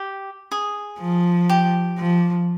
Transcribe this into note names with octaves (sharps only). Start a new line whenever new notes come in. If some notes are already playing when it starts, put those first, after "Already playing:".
Already playing: G4
G#4
F3
G4
F3